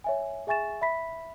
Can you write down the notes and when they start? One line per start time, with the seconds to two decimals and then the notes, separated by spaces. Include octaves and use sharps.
0.04 C#5 E5 G#5
0.47 G#4 E5 G#5 C#6 A6 E7
0.82 E5 B5 B6